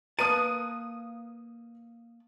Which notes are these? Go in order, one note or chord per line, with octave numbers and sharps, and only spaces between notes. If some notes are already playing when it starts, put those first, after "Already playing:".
A#3 B4 A5 D#6 D#7